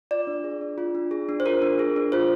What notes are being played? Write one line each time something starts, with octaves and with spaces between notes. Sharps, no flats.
F4 D5
D4
G#4
D4
F4
D4
G#4
D4
C5
F4 A#4
D4
G#4
D4
F4 C5